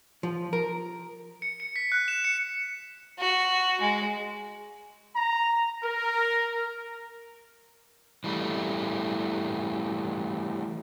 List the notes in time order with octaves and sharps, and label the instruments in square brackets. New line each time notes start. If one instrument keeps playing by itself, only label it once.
[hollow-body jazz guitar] F3
A#4
[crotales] C#7
C#7
B6
F#6
E7
C#7
[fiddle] F#4
G#3
[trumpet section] A#5
A#4
[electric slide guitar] E3 G3 A3